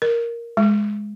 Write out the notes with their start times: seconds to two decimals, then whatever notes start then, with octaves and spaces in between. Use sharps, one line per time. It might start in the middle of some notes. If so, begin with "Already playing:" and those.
0.02 A#4
0.57 G#3